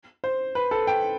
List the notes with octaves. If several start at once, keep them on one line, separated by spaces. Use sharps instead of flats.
C5
B4
A4
G5